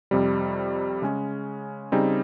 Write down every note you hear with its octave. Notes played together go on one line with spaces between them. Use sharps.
F2 C3 G3
C#3 G#3 C#4
C#3 G3 C4 D#4 G#4